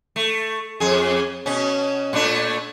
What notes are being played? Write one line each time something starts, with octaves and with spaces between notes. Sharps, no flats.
A3
F2 G#4
B2 C#4
A#2 A3 D4